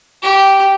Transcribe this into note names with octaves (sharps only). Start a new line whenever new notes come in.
G4